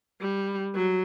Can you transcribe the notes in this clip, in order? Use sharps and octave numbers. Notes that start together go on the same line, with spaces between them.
G3
F#3